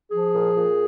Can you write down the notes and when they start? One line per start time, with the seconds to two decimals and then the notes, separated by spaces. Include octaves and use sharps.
0.12 F3 G#4
0.34 A#2
0.56 A#2